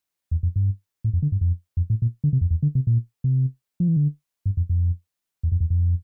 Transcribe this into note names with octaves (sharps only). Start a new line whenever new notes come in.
E2
F2
G2
A2
F2
D3
G2
F2
F2
A2
A#2
D3
C3
F2
E2
D3
C3
A#2
C3
F3
E3
D3
G2
F2
F2
E2
F2
E2
F2